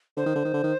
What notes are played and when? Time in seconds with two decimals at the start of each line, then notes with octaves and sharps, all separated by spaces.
0.17 D3 C5
0.26 D#3
0.36 D3
0.45 D#3
0.54 D3
0.63 D#3